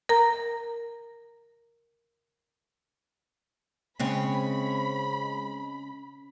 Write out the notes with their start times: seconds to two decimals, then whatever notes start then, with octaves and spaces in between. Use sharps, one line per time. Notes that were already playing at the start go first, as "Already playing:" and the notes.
0.09 A#4 A#5
4.00 C#3 G#3 C4 C#4 B5